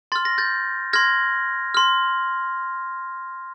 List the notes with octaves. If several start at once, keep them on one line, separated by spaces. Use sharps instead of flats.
C6 F6 A6
A#6
G6 A6
C6 F6 G#6 A#6
C6 F6